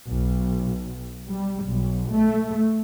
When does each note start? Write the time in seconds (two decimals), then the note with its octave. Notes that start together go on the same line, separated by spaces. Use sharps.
0.10 B1
1.28 G3
1.64 B1
2.13 A3